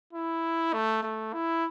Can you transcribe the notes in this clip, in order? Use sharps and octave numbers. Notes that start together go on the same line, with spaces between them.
E4
A3
A3
E4